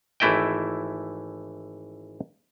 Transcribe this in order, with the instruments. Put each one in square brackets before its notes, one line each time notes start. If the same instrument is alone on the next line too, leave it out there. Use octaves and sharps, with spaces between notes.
[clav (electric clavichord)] G#1 E3 A3 E4 D#5 G5